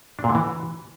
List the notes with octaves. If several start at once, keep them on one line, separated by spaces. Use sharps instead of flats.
D4
A#2
D3
E3